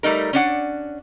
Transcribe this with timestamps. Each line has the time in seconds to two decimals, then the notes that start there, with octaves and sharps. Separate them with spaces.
0.03 G3 A3 D#4 A#4
0.33 C#4 D4 F#5